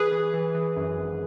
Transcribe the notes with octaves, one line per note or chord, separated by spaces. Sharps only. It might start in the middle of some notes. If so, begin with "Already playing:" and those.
Already playing: E3 G#4 B4
E3
E3
E3
F#2
G#1